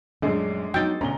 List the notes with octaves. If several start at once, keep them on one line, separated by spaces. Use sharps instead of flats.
A#1 F#2 G#3 A3 D4
F#3 B3 D#4 G5 E6 A6
D2 B2 C#4 A#5 G7